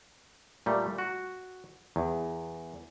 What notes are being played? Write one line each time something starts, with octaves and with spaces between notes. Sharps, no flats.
A#2 G3 A3
F#4
E2